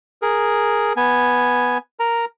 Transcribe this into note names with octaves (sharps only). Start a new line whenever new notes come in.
G#4 A#4
B3 G#5
A#4 A#5